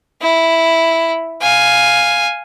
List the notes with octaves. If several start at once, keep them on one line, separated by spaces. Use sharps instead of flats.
E4
F5 G#5